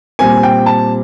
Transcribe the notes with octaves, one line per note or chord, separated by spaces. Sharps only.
A#2 G3 C4 G#5
G5
A5